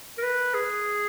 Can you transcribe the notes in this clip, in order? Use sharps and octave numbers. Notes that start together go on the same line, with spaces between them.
A#4
B4
G#4